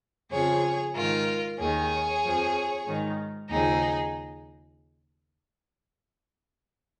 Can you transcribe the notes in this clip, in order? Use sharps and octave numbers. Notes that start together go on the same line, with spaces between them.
F2 C#3 F3 G#4 C#5
G#2 D#3 F4 A#4
D#2 D#3 G#4 C#5
F2 F3
G#2 D#3
D#2 C#3 F3 D#4 G#4